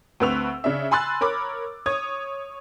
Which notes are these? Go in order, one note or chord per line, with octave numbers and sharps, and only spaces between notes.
D2 C4 B4 C#6 E6 F7
C#3 D4 E5
G#5 B5 C6 E6 F#6 A6
A#4 C#5 B5 D6
C#5 D#6 G#6